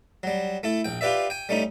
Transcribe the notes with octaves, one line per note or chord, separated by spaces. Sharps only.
F#3 G3
A3 E4 A4
A#1 G5
F4 G4 B4 D5 E5
G5 G#5
G3 A3 C#4 D#4